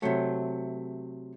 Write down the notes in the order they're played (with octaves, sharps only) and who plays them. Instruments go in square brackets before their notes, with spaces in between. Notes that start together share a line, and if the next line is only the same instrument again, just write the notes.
[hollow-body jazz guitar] C3 F#3 A3